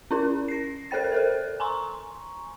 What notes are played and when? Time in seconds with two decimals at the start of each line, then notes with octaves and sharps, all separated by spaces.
0.11 C#4 E4 A#4
0.48 A#6 C7
0.91 A4 A#4 C5 G5 A6
1.12 A4 A#4 C5
1.60 G#5 A#5 C6 C#6